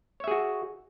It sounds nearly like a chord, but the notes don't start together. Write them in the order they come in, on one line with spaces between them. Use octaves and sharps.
C#5 E5 G#4 F#4